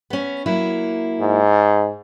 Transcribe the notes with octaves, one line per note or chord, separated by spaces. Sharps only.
B3 C#4
F#3 A#3 E4
G#2